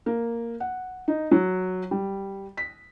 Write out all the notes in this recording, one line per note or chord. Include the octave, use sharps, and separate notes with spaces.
A#3
F#5
D#4
F#3
G3
B6